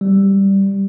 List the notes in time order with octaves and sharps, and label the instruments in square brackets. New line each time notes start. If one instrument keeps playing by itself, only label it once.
[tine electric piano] G3